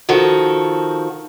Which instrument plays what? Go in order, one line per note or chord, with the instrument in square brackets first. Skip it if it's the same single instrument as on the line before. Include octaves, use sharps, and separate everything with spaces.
[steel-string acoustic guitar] D#3 F3 F#4 A4